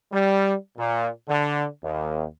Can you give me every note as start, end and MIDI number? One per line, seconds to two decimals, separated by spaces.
0.12 0.53 55
0.78 1.08 46
1.27 1.65 50
1.83 2.25 39